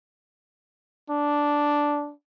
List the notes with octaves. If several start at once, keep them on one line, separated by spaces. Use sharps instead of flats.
D4